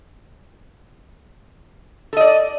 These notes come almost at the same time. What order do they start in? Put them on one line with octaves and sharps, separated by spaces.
A4 D#5 D5